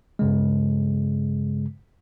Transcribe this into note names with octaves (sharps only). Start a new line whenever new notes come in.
G2 C#3 G#3